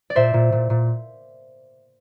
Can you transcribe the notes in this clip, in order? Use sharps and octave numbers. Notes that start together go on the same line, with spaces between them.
D5
A#2 C5 E5
A#2
A#2
A#2